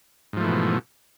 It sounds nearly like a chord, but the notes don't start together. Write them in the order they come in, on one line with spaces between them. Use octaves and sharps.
G#2 F3 A3 E3 B2